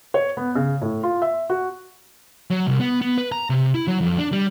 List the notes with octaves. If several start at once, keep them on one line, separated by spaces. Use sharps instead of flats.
C#5
B3
C#3
A2
F4
E5
F#4
F#3
C2
B3
B3
B4
A#5
C3
E4
F#3
F2
D4
G3